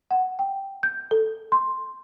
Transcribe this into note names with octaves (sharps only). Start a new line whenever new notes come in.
F#5
G5
G6
A4
C6